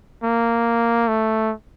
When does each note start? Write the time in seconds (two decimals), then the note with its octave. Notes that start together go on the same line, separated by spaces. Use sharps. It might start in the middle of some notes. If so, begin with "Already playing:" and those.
0.23 A#3
1.08 A3